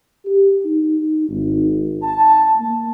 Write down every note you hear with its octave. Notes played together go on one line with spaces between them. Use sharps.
G4
D#4
G#1
A5
A#3